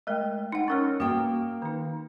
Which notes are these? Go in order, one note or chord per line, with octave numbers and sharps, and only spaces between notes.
G#3 A3 A#4 D#5 G5
D#4 F#5
C#4 A#4 C#5 C#6 E6 F6
A#3 F#4 G5
D#3 D#4